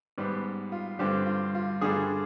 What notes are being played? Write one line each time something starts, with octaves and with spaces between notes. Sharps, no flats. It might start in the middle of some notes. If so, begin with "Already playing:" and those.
G#2 G3 B3
F4
G2 D3 G3 C4 G4
F4
F4
G2 D3 G3 G#4